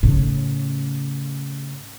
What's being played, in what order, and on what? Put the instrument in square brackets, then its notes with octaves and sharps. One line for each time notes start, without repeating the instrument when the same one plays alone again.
[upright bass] A2 C#3